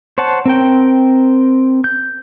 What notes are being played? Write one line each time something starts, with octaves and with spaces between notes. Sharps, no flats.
C5 C#5 F#5 A5
C4 A#4 G5
G6